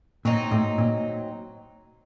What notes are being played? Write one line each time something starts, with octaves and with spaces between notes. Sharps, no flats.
A#2 F#3 C4 D#4
A2
A#2